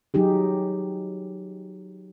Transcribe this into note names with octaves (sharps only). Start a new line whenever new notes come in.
F#3 D#4 G4 G#4